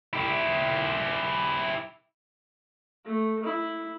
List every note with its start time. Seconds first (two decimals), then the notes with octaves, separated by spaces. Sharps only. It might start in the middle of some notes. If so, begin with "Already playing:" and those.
0.13 E4 G4
3.05 A3
3.44 E4